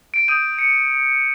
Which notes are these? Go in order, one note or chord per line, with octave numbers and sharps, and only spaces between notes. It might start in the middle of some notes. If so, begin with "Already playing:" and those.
D7
D#6 G6 D#7
C#7